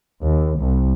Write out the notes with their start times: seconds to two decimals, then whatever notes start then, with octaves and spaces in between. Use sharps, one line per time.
0.22 D#2
0.57 C2